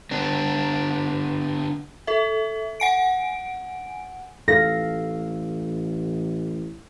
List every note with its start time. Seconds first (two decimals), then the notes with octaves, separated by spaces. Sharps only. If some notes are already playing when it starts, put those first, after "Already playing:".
0.11 D3 B3 D4
2.07 A4 E5
2.80 F#5 G#5 D7
4.48 A1 A4 F5 A#6